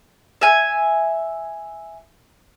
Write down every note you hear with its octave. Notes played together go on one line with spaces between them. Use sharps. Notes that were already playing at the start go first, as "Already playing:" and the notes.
E5 G#5